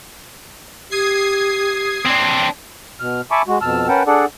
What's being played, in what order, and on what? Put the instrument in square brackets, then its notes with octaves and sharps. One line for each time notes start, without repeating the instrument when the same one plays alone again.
[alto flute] G4 [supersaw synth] D#6 G#6 C7
[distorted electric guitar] C4 D4
[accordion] B2 F6
E5 G#5 A5 B5 C#6 D6
G#3 F#4
F2 B2 A5 E6 F6
C#4 A#4 B4 F#5 G5 A5
D4 G#4 A4 D5 F#5